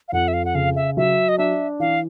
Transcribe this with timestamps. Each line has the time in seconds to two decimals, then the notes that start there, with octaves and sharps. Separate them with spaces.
0.08 F5
0.12 F2 F#5
0.28 E5
0.34 F5
0.45 F#5
0.55 C#3 F5
0.76 E5
0.97 F#3 E5
1.29 D#5
1.38 D4 E5
1.80 E3 F5